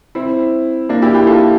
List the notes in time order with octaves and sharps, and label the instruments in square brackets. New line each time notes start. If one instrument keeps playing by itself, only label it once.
[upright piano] C4 E4
A#3 D4
E4 G4
E4 G4
F4 A4